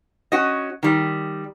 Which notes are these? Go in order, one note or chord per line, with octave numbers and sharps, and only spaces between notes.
C#4 F#4 D#5
D#3 G3